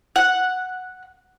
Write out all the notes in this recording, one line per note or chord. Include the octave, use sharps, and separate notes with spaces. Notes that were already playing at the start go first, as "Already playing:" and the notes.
F#5